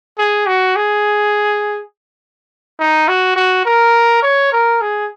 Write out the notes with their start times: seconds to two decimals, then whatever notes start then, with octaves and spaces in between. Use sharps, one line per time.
0.18 G#4
0.47 F#4
0.76 G#4
2.79 D#4
3.08 F#4
3.36 F#4
3.66 A#4
4.23 C#5
4.52 A#4
4.81 G#4